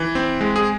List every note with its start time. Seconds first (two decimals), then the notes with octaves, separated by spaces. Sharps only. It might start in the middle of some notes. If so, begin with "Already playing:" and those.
Already playing: E3
0.15 C4
0.41 G#3
0.56 G#4